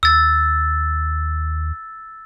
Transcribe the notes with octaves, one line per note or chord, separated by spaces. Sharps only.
D#2 E6 A6